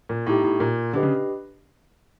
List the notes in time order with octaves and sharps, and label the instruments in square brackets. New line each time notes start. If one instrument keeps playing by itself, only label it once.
[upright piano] A#2
[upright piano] A2 [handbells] B3 D#4 G4
[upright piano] A2
A#2
[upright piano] D3 [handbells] D4 G4 B4 D#5
[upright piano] C#3